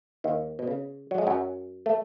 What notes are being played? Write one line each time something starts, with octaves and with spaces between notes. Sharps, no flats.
D#2 D#3
B2
C#3
F#3
G#3
F#2 F#3
A3